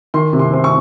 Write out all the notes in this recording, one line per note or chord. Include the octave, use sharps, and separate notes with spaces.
D#3 C6
C3
C6
C4 C6
C#6